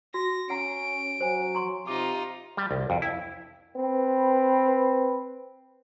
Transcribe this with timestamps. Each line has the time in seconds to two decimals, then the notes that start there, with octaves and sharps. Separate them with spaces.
0.14 F#4 A#6
0.50 C#4 F#5 A#5 D7
1.21 F#3 C5 G#5
1.55 A#5 C6 C#6
1.87 C3 D#4 F4 D6
2.57 G3
2.71 C2
2.90 F2
3.02 E4
3.76 C4 B4